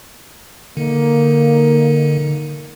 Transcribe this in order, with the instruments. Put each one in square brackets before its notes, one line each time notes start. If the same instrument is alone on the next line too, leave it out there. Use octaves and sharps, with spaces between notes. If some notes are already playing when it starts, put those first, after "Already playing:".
[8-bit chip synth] D3 [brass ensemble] A#3 D#4